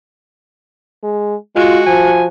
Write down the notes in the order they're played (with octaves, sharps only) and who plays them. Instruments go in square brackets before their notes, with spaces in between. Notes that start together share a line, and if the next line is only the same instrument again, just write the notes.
[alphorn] G#3
[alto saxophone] G#3 [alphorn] F4 [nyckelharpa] F#4
[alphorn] F3 [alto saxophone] G#5